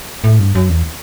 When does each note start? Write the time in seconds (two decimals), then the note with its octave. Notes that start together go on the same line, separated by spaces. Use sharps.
0.24 A2
0.39 G2
0.55 F#2
0.69 E2